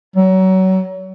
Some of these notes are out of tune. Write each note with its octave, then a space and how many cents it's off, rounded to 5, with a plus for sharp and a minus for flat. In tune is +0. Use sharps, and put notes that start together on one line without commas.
F#3 +30